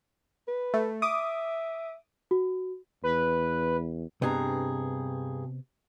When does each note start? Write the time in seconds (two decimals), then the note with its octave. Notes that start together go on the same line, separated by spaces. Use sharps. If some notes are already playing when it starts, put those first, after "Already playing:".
0.48 B4
0.74 A3
1.02 E5 D6 D#6
2.31 F#4
3.03 E2 B4
4.22 G2 C3 B3 G#4 D#5 A#5